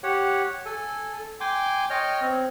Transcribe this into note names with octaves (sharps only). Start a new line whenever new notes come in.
G4 C#5 F#5
A4 G#5
G5 G#5 C6 D6
C#5 D#5 G5 F6
C4